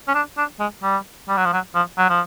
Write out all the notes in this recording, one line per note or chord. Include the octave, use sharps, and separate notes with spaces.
C#4
D4
D4
G#3
G3
G3
F#3
F3
F#3
F3
F#3
F3